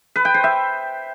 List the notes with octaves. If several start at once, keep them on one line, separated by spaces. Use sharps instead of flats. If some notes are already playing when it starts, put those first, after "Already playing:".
B4
G5
C5
E5